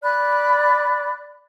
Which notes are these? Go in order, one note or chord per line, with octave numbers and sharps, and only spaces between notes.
D5 B5 F#6